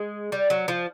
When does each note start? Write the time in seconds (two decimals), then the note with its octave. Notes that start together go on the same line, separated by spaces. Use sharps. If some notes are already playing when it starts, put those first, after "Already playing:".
Already playing: G#3
0.32 G3
0.50 F#3
0.68 F3